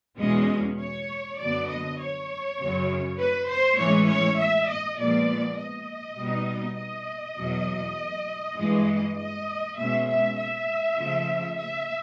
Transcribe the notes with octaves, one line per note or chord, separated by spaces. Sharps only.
E2 B2 G#3 C#4 D#5
C#5
F#2 D3 F#3 B3 D5
D#5
C#5
F#2 C#3 F#3
B4
C5
A2 E3 G#3 C#4 C#5
C#5
E5
D#5
A#2 F3 G#3 B3 D5
D#5
B2 G3 B3 D#4
D#5
E2 B2 F#3
G2 E3 G#3
D#5
B2 G#3 C#4 E5
E5
E5
C#3 F3 A3
E5